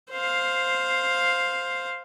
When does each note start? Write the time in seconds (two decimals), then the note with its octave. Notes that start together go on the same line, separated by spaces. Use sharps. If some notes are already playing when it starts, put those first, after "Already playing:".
0.11 C5 F5